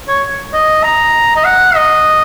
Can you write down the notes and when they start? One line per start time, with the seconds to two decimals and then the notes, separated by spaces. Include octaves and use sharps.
0.08 C#5
0.54 D#5
0.84 A#5
1.36 D#5
1.45 F#5
1.75 D#5